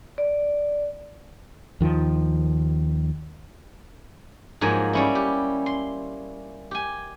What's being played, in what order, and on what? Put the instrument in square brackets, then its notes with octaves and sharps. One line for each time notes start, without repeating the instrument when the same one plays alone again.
[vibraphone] D5
[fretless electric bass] D#2 D#3 F3
[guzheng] G#2 F3 F#3 A#3 G#5
G3 C#4 E4
G4
C6
G4 G#5